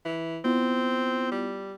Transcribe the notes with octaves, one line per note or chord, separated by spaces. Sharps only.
E3
B3 C4 E4 F4
G3